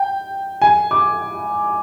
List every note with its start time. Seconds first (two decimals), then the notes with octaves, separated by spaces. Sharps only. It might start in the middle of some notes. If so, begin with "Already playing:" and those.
Already playing: G5
0.62 G#5
0.91 D6